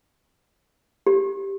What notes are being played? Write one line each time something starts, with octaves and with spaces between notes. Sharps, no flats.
G4